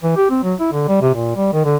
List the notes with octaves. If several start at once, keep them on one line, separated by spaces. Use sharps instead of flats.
E3
G4
C4
F#3
E4
D3
G3
C3
A#2
G3
D#3
D3